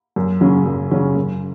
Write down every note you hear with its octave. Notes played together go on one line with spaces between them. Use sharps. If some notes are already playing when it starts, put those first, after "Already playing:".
F#2
C#3 F#3 C#4
F#2
C#3 F#3 C#4
F#2